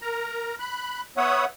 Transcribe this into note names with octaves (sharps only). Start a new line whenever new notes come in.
A#4 A#5
B5 F#6
B3 C#5 E5 F#5 D#6